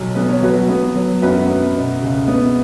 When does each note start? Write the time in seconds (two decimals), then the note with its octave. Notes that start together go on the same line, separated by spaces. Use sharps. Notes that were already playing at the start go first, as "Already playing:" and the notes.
Already playing: B1 F#3
0.15 B3 B4
0.29 C#5
0.42 F#3 F#4 B4
0.69 B3
0.95 F#3
1.22 F#2 F#4 B4
1.48 B3
1.76 B2
2.02 C#2
2.28 B3